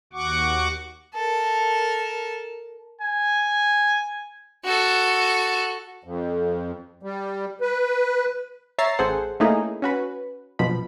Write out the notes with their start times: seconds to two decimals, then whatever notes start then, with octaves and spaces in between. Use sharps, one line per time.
0.13 D#2 F#4 F#5 C#6 D6
1.15 A4 A#4
3.01 G#5
4.65 F#4 A4
6.04 F2
7.03 G3
7.61 B4
8.78 C#5 E5 A#5 A6 C7
8.99 A1 G#4 A4 C5 F#5
9.40 A3 A#3 C#4 D#4 E4 G#4
9.82 C#4 F#4 B4
10.59 A#1 F#2 B2 F3 B5